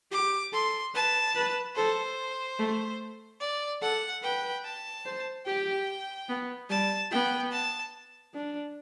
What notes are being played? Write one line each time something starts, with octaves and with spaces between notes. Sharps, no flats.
G4 D6
A4 C6
B4 A5
B4
A4 C5
A3
D5
A4 F#5
B4 G5
A5
C5
G4 G5
B3
G3 A5
B3 G5
A5
D4